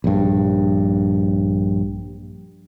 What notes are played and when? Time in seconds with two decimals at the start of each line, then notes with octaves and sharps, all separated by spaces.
0.04 A#1 G2